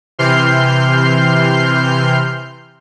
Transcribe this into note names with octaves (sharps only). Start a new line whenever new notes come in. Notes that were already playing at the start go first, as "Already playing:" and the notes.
C3 E3 C6 F6 G6 C7